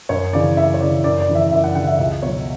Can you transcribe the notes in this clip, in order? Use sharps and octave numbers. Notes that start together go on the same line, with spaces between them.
F#2 C#5
C#3 E3 D5
F#2 E5
C#5
C#3 E3 D5
F#2 D5
D5
C#3 E3
E5
F#2 E5
F#5
C#3 E3 F#5
E5
C#2 E5
B2 F#3 C#5